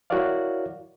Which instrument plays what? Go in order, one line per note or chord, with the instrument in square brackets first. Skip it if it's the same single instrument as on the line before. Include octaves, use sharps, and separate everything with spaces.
[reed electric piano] E4 F#4 A#4 C#5 D5 F5